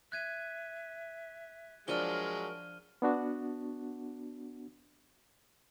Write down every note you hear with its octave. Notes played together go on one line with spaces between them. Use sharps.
E5 F#6 G#6 D#7
F3 F#3 G#3 D4 A#4 F6 D#7 G7
B3 D4 F#4